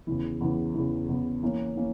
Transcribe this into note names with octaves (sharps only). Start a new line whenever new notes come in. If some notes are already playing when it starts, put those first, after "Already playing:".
E2 C#3 E3
E2 C#3 E3
E2 C#3 E3
E2 C#3 E3
E3 A#3 C#4
E3 A#3 C#4